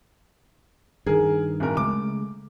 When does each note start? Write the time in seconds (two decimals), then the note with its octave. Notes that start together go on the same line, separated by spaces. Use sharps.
1.06 G2 D#3 G#4 A#4
1.60 D1 A#4
1.77 C#3 G#3 A3 D6